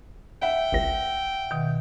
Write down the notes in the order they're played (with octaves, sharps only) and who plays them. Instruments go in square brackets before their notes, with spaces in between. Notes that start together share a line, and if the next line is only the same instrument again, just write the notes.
[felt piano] E5 F#5 [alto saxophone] G5
[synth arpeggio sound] G#1 C#2 A#6
[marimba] B2 D#3